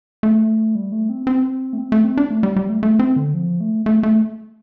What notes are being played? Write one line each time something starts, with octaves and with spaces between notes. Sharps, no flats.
A3
G3
A3
C4
C4
A3
C4
A3
C4
D4
A3
G3
G3
A3
A3
C4
D3
F3
A3
A3
A3